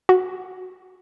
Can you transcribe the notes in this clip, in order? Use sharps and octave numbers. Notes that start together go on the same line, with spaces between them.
F#4